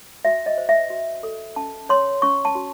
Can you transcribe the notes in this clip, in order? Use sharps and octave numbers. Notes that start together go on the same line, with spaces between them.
F#4 E5
D#5
C5
E5
F#4
A4
C#4 A5
C#5 C6
C#4 C#6
A5
F#4